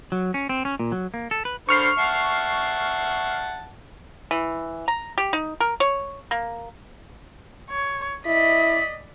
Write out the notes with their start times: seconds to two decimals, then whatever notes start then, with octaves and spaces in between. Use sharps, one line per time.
0.12 F#3
0.34 C#4
0.49 C4
0.65 C#4
0.80 A#2
0.92 F#3
1.14 A#3
1.31 A4
1.45 B4
1.69 D3 C5 B5 C#6 F6 C7
1.98 E5 F#5 A5
4.31 E3
4.88 A#5
5.18 G4
5.33 D#4
5.60 A#4
5.80 C#5
6.31 A#3
7.70 C#5
8.26 E4 D5 D#5 B6